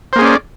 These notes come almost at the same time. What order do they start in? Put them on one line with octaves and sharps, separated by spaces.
C5 A#3 G#4 C#4 D5